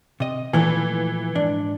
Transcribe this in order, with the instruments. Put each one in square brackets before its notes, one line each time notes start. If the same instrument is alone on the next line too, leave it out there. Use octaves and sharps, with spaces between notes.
[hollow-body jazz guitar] C3 D#5
[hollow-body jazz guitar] A#2 F3 A3 [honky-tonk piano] E3
[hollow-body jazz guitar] G#2 D4